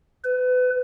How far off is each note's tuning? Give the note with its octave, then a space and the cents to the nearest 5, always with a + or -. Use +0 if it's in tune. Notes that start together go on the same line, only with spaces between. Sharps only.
B4 +30